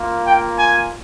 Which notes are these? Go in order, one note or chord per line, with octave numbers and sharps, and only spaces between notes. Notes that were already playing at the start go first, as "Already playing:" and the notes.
Already playing: A#3 F4
G5
G#5